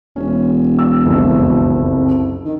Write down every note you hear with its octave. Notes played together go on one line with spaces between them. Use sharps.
E1 C#4
E6
F#1 C2 F2
D#3